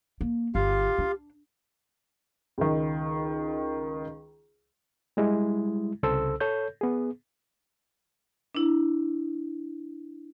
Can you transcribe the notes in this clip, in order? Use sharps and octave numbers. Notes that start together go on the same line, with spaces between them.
A#3
G1 F4 G4 F5
D4
C#2 D#3
G3 G#3 E4
C2 C#3 A4 C5 E6
A4 C#5 G6
B3 G#4
D4 E4